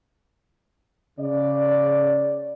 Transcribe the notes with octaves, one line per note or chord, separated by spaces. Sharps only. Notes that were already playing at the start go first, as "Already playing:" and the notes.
C#3 D5